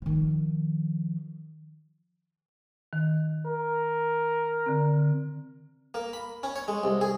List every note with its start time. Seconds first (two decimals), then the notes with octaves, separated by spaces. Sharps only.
0.02 D#3 F3
2.93 D#3
3.46 A#4
4.66 D3 C4
5.94 A#3
6.13 B5
6.43 C#4
6.56 C#5
6.68 G#3
6.84 C2
7.01 G#4